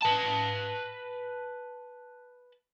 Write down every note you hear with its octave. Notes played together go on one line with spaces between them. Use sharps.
B4 A5